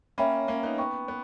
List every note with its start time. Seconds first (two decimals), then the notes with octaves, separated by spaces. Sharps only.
0.18 A#3 C#4 C#5 E5 G5 B5
0.48 A#3 C#4
0.63 B3 D#4
0.78 B3 B4 G5 C#6
1.08 B3